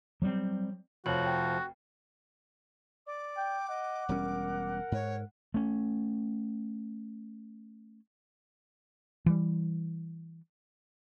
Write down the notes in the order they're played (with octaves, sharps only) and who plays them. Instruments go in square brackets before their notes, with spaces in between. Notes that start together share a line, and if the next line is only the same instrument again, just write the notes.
[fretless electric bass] F#3 G3 A#3 C4
[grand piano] F1 [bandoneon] F3 [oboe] F#4 [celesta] C#5 F#7
[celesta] G5
[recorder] D5 [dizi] D6
[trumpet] G5
[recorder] D#5 [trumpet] F#5
[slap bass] E1 G3 C#4 [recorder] A#4
[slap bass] G#2 [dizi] C#5
[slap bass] A3 C#4
[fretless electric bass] E3 G3